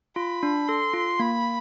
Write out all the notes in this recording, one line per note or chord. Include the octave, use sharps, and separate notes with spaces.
F4 B5
D4
A4 C6
F4
A#3 B5